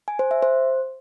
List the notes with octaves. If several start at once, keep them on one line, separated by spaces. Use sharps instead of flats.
G#5
C5
E5
C5